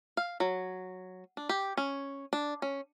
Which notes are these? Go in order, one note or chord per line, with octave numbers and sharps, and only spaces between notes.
F5
F#3
D4
G4
C#4
D4
C#4